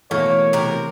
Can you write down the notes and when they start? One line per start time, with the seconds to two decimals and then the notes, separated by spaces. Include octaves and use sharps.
0.11 B2 E3 A3 A#3 C#5
0.53 C3 A#4